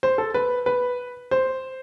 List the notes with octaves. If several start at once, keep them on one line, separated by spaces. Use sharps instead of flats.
C5
A4
B4
B4
C5